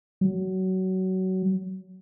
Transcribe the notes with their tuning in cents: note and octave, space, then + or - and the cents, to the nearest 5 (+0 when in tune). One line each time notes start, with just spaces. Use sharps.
F#3 +20